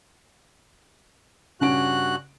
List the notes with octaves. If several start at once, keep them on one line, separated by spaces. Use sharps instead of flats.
G2 C#3 C#4 F#4 F#6 D7